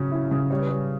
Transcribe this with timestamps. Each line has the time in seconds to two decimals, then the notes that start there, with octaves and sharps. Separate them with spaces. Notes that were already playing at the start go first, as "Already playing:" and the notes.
Already playing: C#3 F#3 C#4
0.11 E4
0.31 C#3
0.50 G3 C#5
0.60 B4
0.69 G3 C#5